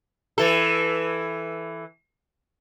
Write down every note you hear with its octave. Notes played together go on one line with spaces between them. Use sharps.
E3 A4